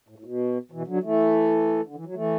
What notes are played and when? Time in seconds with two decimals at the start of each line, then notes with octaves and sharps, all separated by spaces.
0.08 A2
0.18 A2
0.25 B2
0.71 B2 E3
0.87 D3 F#3
1.03 E3 A3
1.86 D3
1.95 E3
2.05 F#3
2.15 E3 A3